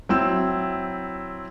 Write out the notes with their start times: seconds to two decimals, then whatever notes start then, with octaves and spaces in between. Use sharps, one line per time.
0.09 F#3 C4 E4 E6